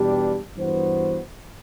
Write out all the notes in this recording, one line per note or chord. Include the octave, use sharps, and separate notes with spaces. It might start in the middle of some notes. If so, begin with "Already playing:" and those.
Already playing: E2 B2 G3 D4 G4
G2 E3 B3 F#4 C5